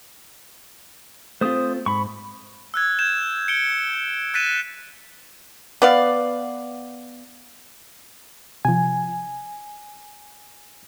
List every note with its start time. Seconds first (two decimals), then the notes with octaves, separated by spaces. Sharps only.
1.41 A3 C4 F4 C5 D#6
1.86 G#2 B5 C#6
2.74 E6 F#6 G#6
2.99 G6 G#6 E7
3.48 C#7 D7 G7
4.34 F#6 A6 B6 D#7 E7
5.82 B3 D5 F5
8.65 C3 F3 G#5